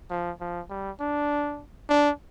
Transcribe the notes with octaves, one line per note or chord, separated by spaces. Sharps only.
F3
F3
G3
D4
D4